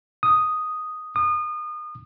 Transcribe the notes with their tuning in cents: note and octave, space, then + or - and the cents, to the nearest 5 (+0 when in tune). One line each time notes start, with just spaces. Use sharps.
D#6 +0
D#6 -30